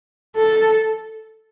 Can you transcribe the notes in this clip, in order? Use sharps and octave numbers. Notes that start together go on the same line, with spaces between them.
A4